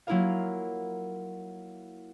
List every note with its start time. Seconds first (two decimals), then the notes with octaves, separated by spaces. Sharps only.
0.07 F#3 A#3 E4 F4 A#4 F5